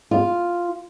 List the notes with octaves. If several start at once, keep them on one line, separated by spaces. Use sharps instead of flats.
F4